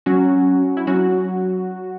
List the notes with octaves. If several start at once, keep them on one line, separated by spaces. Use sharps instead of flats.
F#3 C#4 F#4
E4
F#3 C#4 F#4